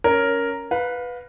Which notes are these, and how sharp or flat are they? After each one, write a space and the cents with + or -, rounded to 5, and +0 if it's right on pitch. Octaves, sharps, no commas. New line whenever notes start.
C#4 +10 A#4 +0 C#5 +0
B4 +0 F5 +30